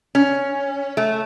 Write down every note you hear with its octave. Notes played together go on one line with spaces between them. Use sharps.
C#4
A3